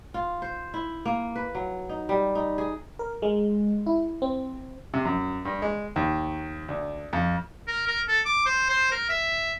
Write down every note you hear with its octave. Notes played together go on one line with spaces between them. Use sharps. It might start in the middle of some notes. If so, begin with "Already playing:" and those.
F4
C5
E4
A#3
B4
F#3
D#4
G3
D#4
G#4
A#4
G#3
E4
C4
C3
F#2
G2
G#3
D#2
D2
F2
A#4
A#4
A4
D6
C5
C5
A#4
E5